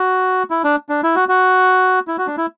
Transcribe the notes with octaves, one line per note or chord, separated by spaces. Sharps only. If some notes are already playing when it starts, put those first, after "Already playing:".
Already playing: F#4
E4
D4
D4
E4
F#4
F#4
E4
F#4
D4
E4